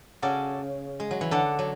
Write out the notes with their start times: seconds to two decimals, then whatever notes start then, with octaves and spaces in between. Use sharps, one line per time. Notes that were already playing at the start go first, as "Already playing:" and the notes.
0.22 C#3 F#4 A4 D5 G#5
1.00 G#3
1.11 F#3
1.21 E3
1.31 D3 A4 D5 F#5
1.59 F#3